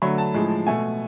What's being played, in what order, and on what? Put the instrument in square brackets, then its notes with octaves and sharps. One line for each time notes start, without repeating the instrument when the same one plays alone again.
[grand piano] D3 F#3 A3 B5
A5
A2 F3 G#3
B2 A3 G#5